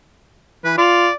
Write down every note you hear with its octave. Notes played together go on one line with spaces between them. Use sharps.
E3 B4
F4 D5